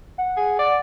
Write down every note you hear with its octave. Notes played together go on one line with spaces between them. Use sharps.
F#5
G#4
D5